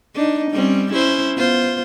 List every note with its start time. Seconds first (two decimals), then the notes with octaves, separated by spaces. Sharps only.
0.15 D4 D#4
0.51 G3 C4 C#4
0.92 C#4 E4 C5
1.36 B3 F4 C5